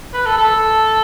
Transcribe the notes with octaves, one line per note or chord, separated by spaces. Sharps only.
B4
A4
A4